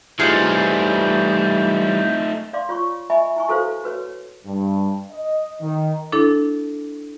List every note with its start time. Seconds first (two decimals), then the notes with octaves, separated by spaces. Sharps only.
0.19 E3 G3 A3 D#4 F4 G#4 F#5 G6
2.53 D5 F5 C6 D6
2.69 F4 C#5 C#6
3.10 D#5 E5 G#5 B5 C#6
3.36 E4 G#5 C#6
3.48 E4 F#4 A4 B4 C5 F5
3.84 F#4 B4 C#5
4.45 G2
5.12 D#5
5.61 D#3
6.12 D4 E4 A4